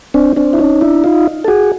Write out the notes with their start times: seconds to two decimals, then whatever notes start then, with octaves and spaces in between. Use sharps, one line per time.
0.14 C4 D4
0.36 C4 D4
0.53 E4
0.59 C#4 D#4
0.81 D4 E4
1.04 D#4 F4
1.44 A4
1.48 F#4 G#4